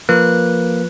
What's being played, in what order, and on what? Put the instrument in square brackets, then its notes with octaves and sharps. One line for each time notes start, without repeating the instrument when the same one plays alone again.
[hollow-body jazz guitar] F3 [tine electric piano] A#3 [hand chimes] B4 [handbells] F#6